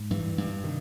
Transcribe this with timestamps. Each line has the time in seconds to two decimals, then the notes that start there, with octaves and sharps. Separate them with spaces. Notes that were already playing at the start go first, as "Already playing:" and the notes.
Already playing: G#2
0.10 G2 E3
0.38 G2
0.64 C3 D#3